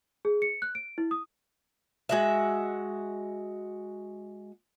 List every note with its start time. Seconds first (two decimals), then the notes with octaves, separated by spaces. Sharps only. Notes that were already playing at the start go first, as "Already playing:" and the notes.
0.25 G#4
0.42 C#7
0.62 F#6
0.75 D7
0.98 E4
1.11 D#6
2.09 G#3 F#4 E5